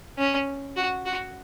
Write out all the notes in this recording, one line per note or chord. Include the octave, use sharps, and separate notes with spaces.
C#4
F#4
F#4